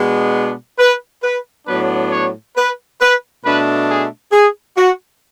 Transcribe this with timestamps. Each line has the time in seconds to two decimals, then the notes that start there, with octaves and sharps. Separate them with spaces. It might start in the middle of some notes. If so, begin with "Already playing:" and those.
Already playing: B2 G#3 B3 D4
0.79 B4
1.23 B4
1.67 A2 F#3 B3 D4 B4
2.12 C#5
2.56 B4
3.00 B4
3.44 B2 A3 D4 B4
3.89 G#4
4.32 G#4
4.77 F#4